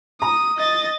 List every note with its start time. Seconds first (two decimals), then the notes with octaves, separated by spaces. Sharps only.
0.22 A#5 D#6
0.58 D#5 A6